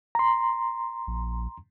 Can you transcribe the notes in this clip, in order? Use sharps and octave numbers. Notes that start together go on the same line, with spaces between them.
A#5 C6
A#1